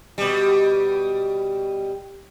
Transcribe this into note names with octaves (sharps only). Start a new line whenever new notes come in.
B2 G3